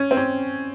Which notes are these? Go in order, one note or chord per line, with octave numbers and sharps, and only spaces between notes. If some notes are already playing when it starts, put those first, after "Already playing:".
Already playing: C#4
C4
C#4